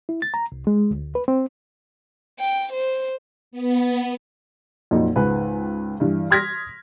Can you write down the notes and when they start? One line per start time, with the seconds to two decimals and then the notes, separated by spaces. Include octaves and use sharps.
0.09 E4
0.22 A6
0.34 A#5
0.52 C2
0.67 G#3
0.91 D2
1.15 B4
1.28 C4
2.39 G5
2.72 C5
3.51 B3
4.91 F2 A#2 F#3 D#4
5.16 C#2 G#2 B4 G#5
6.00 G2 E3
6.30 C6 D#6 F6 G#6 A#6 B6